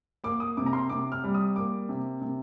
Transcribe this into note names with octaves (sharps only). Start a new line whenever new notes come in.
A#3 D6
D#6
C3 D6
A#5
C6
C3 D6
F6
G3
D#6
A#3 D6
C3
C3